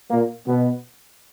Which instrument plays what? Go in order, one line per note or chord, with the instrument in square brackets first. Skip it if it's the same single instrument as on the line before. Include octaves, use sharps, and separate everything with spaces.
[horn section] A#2 A#3
B2 B3